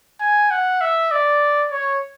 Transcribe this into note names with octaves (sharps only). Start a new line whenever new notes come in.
G#5
F#5
E5
D5
C#5